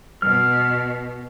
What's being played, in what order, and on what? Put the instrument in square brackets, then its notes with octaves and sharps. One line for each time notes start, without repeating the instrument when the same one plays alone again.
[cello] B2 [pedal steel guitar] F6